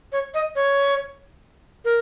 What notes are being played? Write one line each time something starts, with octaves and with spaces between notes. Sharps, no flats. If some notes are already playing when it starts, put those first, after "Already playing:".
C#5
D#5
C#5
A#4